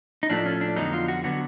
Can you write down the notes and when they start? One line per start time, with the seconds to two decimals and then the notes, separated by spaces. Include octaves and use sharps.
0.23 D#4
0.30 A2 F3 A3 D4
0.46 C#4
0.61 D4
0.76 F2 D3 F#3 B3 D#4
0.93 F4
1.08 F#4
1.24 D3 F#3 B3 F#4